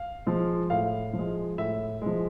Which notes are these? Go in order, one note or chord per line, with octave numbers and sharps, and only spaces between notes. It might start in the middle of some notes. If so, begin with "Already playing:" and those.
Already playing: F5
F3 G#3
A2 F5
F3
G#3
A2 E5
F3 G#3